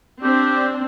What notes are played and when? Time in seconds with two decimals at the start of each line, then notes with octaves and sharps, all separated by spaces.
0.23 C4 D4 G4